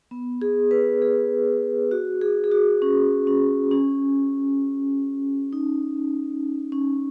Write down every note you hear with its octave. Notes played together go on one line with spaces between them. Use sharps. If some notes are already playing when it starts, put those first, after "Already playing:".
B3
G#4
B4
G#4
F#4
G#4
G#4
F#4
C#4
C#4
C#4
D#4
C#4